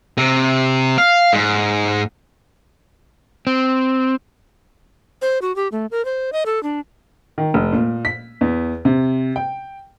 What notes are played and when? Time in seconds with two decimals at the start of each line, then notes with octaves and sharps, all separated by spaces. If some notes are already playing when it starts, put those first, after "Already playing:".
0.17 C3
0.98 F5
1.33 G#2
3.47 C4
5.22 C5
5.42 F#4
5.56 G4
5.72 A3
5.91 A#4
6.05 C5
6.33 D#5
6.46 A4
6.63 D4
7.38 D#3
7.54 F1
7.73 A#2
8.05 B6
8.41 E2
8.85 C3
9.36 G5